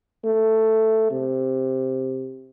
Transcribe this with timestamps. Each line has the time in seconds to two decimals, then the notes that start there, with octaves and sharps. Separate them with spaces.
0.25 A3
1.11 C3